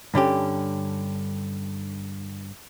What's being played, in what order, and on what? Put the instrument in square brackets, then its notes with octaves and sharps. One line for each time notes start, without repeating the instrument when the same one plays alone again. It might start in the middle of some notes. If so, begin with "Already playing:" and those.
[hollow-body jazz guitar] G2 D3 C#4 G4